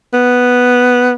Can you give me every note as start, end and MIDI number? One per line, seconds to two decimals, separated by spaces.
0.13 1.12 59